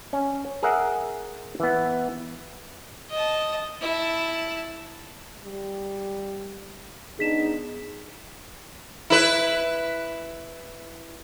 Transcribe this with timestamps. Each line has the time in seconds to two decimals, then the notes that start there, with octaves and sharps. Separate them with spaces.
0.13 C#4
0.63 G#4 A#4 E5 F#5
1.60 E3 B3
3.10 D#5 A5
3.81 E4 A5
5.44 G3
7.19 B3 D4 D#4 G#4 B6 E7
9.10 E4 B4